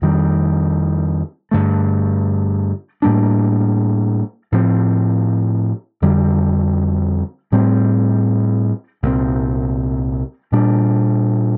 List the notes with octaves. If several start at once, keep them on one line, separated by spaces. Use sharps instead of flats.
F2 D#3 G3
G2 D3 A3
A2 G3 A#3 D4
A2 F3 C4
F2 D3 G3
A2 G3 C4
C2 A#2 F3 C4
A#2 G3 D4